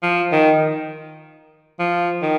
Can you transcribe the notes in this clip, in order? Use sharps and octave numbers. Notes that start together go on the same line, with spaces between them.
F3
D#3
F3
D#3